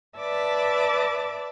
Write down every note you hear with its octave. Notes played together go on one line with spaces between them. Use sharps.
B4 D5 E5 A5 D6